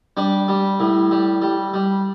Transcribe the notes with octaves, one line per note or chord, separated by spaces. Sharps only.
G3 D4
G3
A2
G3
G3
G3